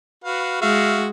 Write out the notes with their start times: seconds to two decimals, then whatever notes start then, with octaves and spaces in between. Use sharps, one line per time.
0.24 F#4 B4 F5
0.62 G#3 F#4 E5 F5